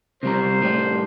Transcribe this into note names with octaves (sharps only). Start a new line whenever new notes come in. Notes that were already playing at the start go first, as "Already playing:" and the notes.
C3 G3 C5 A#5
A2 G3